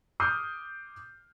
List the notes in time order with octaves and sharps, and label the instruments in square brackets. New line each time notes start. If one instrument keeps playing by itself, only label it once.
[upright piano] D6 D#6 F6 G6 C7